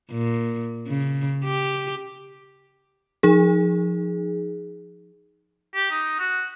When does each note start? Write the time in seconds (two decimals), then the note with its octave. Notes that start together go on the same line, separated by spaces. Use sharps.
0.11 A#2
0.87 C#3
1.44 G4
3.23 F3 D#4 G#4
5.75 G4
5.90 D#4
6.19 F#4